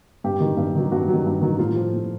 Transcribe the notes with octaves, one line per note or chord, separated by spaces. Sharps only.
G2 G4
D#3 F#3
G2
D#3 F#3
G2 F#4
F#3
D#3
G2
D#3 F#3
A2 F4
F3
A2